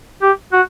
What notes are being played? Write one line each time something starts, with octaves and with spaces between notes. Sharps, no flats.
G4
F#4